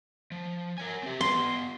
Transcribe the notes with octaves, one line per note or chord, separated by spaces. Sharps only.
F3
A#4 C#5 G#5
C4 G4
B3 F4 B4 C6